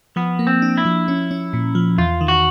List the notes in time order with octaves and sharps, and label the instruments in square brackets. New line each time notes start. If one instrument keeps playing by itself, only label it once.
[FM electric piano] F3 [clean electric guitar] B3
[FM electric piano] A#3
[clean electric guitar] C4
[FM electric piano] D4
[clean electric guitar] E4
[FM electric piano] F3
C#4
C#4
A#2
F3
[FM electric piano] E2 [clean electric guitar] F4
[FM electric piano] D#3
[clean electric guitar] F#4